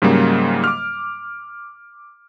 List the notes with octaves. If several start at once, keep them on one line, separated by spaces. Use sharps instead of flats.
G#2 C#3 F#3 G3 A#3
D6 F6